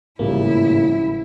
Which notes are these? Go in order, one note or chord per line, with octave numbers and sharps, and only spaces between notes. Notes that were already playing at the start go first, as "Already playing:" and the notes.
G#1 A2 C#3 F3 G3 A#3 E4